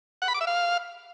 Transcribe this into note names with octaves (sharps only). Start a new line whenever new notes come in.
F#5
B5
D6
E5
F5